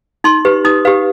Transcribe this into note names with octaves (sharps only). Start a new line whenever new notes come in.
D#4 C6
G4 B4
D#4 D#6
G4 B4 F5